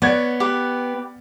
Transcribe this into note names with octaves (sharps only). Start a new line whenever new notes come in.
B3 C#5 D5 F#5 G#6
G4 B4